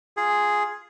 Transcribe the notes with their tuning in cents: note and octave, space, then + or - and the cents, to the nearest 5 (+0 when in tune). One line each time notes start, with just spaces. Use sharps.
F4 +0 G#4 +0